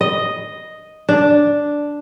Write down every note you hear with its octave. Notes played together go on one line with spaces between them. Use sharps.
D#5
D4